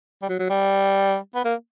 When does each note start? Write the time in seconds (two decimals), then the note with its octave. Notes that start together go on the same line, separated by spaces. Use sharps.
0.22 G3
0.29 F#3
0.39 F#3
0.50 G3
1.35 B3
1.45 A#3